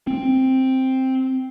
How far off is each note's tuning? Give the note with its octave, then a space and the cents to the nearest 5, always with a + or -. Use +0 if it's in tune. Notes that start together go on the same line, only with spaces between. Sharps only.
C4 +5